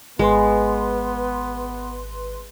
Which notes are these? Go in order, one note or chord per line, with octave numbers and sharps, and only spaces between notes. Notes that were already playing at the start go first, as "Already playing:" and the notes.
G#1 G#3 B3 B4 C6